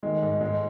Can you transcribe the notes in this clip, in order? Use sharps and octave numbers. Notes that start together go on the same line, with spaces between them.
D#3 G#3
G#2
G#2 G#3